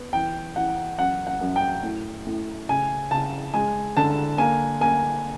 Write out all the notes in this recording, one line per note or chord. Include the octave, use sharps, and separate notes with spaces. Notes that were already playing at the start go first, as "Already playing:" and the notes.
Already playing: B3
E3 G5
E3 F#5
F#2 F#5
F#5
F#2
G5
A2
A2
C#3 G#5
C#3 A5
G#3 G#5
D3 A5
A#3 G#5
A#3 G#5